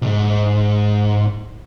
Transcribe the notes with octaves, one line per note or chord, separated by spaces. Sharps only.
B1 G#2